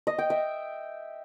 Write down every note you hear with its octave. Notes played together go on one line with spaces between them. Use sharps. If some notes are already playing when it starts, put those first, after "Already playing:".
D#5
G5
E5